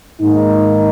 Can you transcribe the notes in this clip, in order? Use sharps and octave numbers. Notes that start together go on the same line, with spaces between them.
G#2 D#3 A#3 D#4